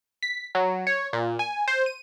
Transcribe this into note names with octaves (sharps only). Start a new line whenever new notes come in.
B6
F#3
C#5
A#2
G#5
C5
D#7